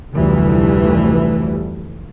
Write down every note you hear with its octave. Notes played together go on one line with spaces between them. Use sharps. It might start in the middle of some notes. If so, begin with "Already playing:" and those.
F1 D2 E3 G3 A3